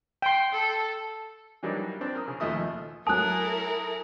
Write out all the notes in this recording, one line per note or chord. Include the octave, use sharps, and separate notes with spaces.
G5 C6
A4
E3 F#3 G3 A#3 D4 D#4
C4 D4
A#4 D#6
C#3
D#2 B2 F3 A3 D#5 D#6
F#3 E4 A4 A#4 G#5 A5 D#6 F#6